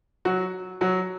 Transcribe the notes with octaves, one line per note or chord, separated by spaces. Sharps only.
F#3 F#4
F#3 F#4